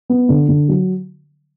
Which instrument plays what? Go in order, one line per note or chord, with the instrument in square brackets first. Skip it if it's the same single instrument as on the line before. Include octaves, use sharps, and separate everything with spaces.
[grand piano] B3
D3
D3
F#3